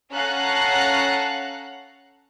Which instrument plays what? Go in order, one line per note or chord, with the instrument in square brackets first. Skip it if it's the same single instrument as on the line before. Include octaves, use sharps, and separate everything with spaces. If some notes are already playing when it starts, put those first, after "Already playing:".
[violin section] C#4 A4 F5 F#5 A#5 F#6